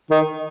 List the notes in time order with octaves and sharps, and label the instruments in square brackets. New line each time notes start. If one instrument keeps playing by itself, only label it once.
[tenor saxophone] D#3